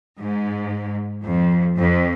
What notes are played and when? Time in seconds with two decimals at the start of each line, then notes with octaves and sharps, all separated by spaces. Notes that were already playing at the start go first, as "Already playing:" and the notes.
0.19 G#2
1.25 F2
1.78 F2